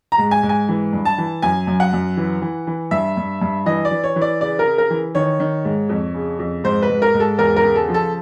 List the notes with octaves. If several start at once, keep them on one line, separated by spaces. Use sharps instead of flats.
A#5
G#2
G#5
G#2
G#5
E3
G2
A5
E3
F#2 G#5
F#2
F#5
F#2
E3
E3
E3
G2 E5
G2
G2
E3 D#5
D5
E3
C#5
E3
D5
C#3 D5
A#4
C#3
A#4
E3
D#3 C#5
D#3
G#2
F2
C#3
F2
G#2 C5
B4
G#2
A#4
G#2
A4
E2 A#4
A#4
C#3
A4
F3
A4